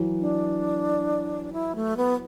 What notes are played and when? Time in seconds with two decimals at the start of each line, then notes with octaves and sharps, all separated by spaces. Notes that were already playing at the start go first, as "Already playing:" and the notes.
Already playing: E3 F#3
0.20 D4
1.53 E4
1.76 A3
1.97 B3